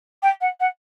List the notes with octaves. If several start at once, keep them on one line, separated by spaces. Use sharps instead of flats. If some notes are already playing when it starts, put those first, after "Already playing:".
G5
F#5
F#5